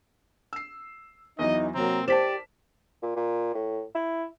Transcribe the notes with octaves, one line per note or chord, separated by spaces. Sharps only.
E6 C7
E2 E3 F#3 D#4 D#5
C3 F#3 A#3 C4 A#5
G4 A#4 C5 D5 A5 B6 E7
A#2
A#2
A2
E4